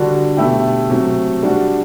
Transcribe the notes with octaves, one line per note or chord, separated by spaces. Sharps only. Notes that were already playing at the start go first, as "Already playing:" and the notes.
Already playing: D3 G3 D4 F#4
B2 A3 E4 G4
C3 F#3 A3
G3 D4 F#4